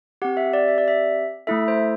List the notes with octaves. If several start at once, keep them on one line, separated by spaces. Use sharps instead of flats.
C4 G4 F#5
E5
D5
E5
D5
E5
A3 E4 A4 E5
C5